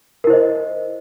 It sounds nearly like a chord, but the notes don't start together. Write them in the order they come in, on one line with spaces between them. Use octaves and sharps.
A#4 E4 C5 D#5